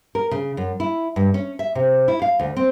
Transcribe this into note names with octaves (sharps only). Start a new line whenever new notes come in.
A#4
C#3
F#2
E4
G2
C#4
E5
C3
E4
F5
D2
C4